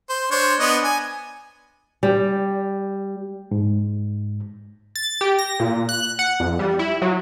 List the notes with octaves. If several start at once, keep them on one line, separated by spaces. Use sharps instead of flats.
C5
D4 C5 C#5
B3 D4 D#5
G#5
G3
G#2
A6
G4
A#6
A#2
F#6
F#5
F2
G3
E4
F#3